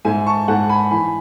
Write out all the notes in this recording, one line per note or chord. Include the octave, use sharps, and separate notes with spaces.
G#2 E5 G#5
A5 C#6
G#2 F#5 A5
G#5 B5
E3 G#5 B5